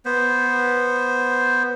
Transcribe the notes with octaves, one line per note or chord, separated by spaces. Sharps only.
B3 C5